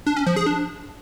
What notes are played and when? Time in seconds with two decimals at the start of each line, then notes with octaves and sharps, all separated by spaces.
0.06 D4
0.16 C#4
0.26 F3
0.36 G#4
0.46 D4